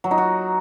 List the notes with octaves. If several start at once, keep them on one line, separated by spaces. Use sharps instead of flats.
F#3
D#4
F#4